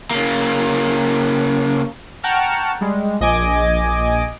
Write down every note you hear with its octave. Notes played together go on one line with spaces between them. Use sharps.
C#3 A#3
F#5 G5 A5 A#5 C#6 F6
G3 G#3
A#1 D#5 G#5 D6